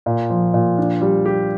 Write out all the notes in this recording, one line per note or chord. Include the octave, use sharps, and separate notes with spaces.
A#2
F3
A#2
D4
G3
G4